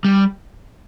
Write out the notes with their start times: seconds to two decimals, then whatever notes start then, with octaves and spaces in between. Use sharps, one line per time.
0.05 G3